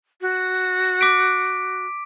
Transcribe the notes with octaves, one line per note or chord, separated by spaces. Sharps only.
F#4
D6 B6 D7